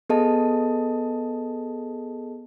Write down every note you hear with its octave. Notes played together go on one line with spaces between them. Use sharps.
B3 G#4 A4 D#5 A5